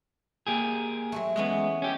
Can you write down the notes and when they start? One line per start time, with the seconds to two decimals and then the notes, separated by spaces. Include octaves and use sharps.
0.47 A#3 G4 G#4
1.12 F#3 G#3 A3
1.36 E3 G#3 B3 C#4 E5
1.82 C#4 G4